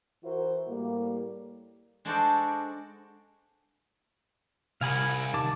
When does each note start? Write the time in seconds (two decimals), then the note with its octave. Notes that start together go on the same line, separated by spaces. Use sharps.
0.23 E3 E4 F#4 A#4 C5
0.68 A2 G3 A#3
2.05 G#3 D4 F#4 A4 C5 D5
4.81 C2 F5 G#5 B5
5.34 D#3 A5 D6